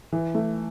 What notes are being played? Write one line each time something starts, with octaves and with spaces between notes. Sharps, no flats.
E3
A3